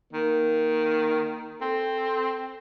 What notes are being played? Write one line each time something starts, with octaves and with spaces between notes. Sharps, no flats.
D#3 A#3
C4 A4